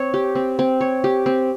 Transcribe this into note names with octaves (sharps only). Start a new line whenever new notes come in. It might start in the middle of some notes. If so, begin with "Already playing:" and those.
Already playing: C4 C#5
G4
C4
C4
C#5
G4
C4